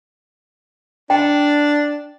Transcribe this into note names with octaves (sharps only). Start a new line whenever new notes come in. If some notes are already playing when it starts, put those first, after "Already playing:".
D4 G5